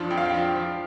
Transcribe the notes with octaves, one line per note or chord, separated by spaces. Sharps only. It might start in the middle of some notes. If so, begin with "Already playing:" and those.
Already playing: F2 F3 D4 F4
F2 G5
F5
G5
F3 D4 F4
F3